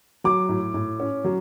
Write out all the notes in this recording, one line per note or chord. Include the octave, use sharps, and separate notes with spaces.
F#3 D6
A2
A2
C#4
F#3